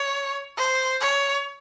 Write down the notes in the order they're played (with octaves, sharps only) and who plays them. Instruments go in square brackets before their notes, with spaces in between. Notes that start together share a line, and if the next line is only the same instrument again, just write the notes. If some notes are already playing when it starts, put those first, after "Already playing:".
Already playing: [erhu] C#5
C5
C#5